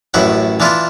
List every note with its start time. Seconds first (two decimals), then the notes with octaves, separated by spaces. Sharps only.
0.14 A1 F#2 E4 F#5
0.60 E3 D4 E4 F4